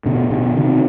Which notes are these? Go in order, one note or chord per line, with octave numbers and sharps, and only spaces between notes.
B2 D3
B2 D3
C3 D#3